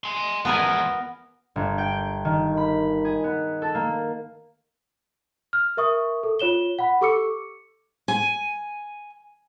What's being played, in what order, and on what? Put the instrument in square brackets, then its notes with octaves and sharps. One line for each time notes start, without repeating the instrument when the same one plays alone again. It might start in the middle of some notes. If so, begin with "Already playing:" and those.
[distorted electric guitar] G#5 C6
[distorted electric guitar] E2 F3 [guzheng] B3 A#4 G#5
[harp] G1
G5
D#3
B5
G#4
B3
A4
A#3
[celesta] F6
A#4 E5 C#6 D#6
A4
F4 C#5 E7 G7
F#5 B5
G4 A4 C#6 D6 E6 C#7
[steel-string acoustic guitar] G#5